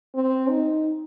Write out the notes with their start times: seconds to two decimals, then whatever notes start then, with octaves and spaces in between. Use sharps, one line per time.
0.15 C4
0.49 D#4